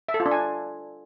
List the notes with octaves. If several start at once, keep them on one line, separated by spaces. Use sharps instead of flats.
E5
A4
F4
D4
G#5